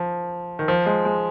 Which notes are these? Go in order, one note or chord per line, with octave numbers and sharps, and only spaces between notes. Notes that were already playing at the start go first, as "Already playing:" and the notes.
Already playing: F3
D#3
F3
G#3
G#3